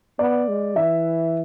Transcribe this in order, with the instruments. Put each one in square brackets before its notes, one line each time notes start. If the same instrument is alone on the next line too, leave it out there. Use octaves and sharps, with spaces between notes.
[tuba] B3 [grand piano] D5
[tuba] G#3
[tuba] E3 [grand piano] E5